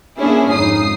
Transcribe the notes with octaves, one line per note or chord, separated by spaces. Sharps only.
A#3 B3 C#4 D4 E4 G#4
G#1 F2 D#4 D#6 C7